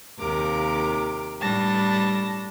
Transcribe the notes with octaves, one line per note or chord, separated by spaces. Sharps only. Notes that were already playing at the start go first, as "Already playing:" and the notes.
D#2 C3 A#4 D6
A2 G3 D4 A5 A#6